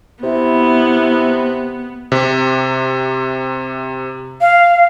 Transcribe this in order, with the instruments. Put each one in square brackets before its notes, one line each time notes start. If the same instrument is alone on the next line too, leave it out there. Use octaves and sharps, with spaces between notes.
[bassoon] C3 [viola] B3 [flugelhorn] E4
[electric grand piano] C3
[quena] F5